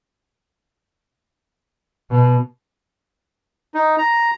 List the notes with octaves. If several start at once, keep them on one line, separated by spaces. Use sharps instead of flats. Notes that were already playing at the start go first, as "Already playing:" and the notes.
B2
D#4
A#5